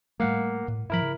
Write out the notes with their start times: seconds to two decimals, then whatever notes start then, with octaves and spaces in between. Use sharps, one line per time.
0.20 A2 G3 A3 A#3 F5 F#5
0.68 A2
0.90 G#2 F3 E4 A#4 B5
1.02 C#3